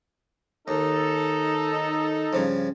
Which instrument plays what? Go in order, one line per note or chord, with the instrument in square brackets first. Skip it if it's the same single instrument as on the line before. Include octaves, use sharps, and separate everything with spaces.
[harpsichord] D#2 [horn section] D#4 A4
[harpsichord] G2 C#3 F3